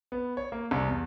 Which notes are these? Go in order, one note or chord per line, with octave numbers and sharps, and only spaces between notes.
B3
C#5
A#3
C2
E2